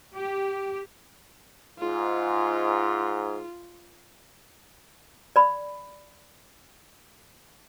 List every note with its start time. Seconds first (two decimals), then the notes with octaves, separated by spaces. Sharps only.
0.15 G4
1.79 G#2 F4
5.36 D5 B5